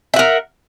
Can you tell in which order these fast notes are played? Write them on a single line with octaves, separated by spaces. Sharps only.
E5 F#5 A#4